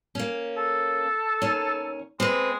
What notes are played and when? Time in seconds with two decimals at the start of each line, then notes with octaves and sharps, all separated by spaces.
0.15 A#3 C#4
0.57 A4
1.42 D#2 C#4
2.20 G#3 C4 B4